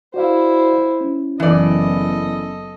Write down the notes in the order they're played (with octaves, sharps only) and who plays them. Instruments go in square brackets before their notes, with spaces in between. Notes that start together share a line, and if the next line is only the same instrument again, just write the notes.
[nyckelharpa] E4 C5 [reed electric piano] F#4 D5 F5
[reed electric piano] C#4
[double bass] F#1 B3 [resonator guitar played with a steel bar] E3 D5 [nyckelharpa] A4 D#5